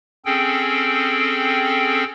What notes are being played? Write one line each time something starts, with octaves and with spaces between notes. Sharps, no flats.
C4 C#4 G#4 A4 G5